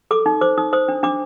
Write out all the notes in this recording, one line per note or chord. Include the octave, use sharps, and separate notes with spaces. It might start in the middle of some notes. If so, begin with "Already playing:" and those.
A4 D6
D#4
C5 D6
D#4 D#6
C5 D#6
D4
D4 D6